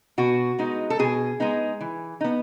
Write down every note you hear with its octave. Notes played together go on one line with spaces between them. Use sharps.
B2 F#4
G#3 B3 D#4
A4
B2 G#4
G#3 B3 D#4
E3
B3 D#4